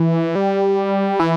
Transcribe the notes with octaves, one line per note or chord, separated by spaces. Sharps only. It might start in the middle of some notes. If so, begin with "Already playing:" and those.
Already playing: E3
G3
E3